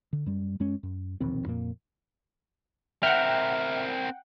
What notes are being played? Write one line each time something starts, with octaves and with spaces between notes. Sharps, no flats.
D3
F#2 G3
F#2 G#3 C#4
F#2
E1 A#1 D#2 C4
F2 A#2 A#3
C4 A#4 E5 F#5 G5 F6